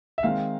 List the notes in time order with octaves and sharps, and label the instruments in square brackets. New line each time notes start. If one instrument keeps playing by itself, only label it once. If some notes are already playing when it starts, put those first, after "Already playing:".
[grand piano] E5
[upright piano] D#3 G#3 C4 D#4 [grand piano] F5